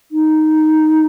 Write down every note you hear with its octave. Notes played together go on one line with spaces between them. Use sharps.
D#4